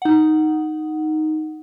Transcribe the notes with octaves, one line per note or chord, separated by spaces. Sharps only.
D#4 F#5